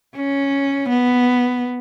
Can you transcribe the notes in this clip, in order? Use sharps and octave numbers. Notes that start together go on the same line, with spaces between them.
C#4
B3